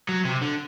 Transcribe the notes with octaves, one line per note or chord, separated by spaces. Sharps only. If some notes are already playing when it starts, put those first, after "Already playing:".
F#3
C3
D3